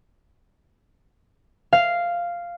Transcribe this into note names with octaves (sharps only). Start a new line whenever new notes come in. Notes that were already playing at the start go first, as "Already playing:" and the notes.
F5